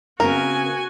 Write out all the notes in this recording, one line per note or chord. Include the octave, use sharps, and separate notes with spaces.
C#3 B3 C4 F#4 A#4 G#5